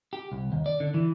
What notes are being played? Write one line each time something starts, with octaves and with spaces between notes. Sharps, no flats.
G4
C2
D#2
D5
D3
E3